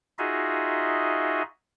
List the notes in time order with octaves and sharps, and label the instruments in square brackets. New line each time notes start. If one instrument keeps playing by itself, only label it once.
[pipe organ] D#4 F4 F#4 G#4 D#5 E5